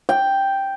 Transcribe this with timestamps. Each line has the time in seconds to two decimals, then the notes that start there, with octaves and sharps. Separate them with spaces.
0.09 G5